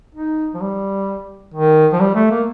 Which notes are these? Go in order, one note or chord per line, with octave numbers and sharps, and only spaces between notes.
D#4
F3
G3
D#3
F3
G3
A3
A#3